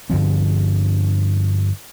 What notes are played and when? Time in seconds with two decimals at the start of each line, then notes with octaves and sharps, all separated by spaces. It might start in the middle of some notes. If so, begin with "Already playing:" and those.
0.10 G2 D3 F3 C4